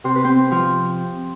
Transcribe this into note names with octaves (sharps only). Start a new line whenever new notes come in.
C3 C5
B4
C4 C5
F3